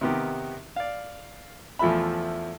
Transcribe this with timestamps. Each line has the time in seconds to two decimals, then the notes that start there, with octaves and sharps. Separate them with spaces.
0.01 C3 D#3 B3 G4 A#4
0.76 D5 F5
1.79 E2 F3 A3 E5 B5